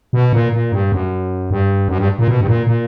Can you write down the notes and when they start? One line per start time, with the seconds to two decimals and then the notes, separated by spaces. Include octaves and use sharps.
0.13 B2
0.33 A#2
0.52 A#2
0.72 G2
0.92 F#2
1.51 G2
1.88 F#2
1.98 G2
2.19 A#2
2.28 B2
2.41 G2
2.47 A#2
2.67 A#2